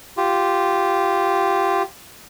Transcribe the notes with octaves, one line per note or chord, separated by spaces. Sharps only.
F4 G4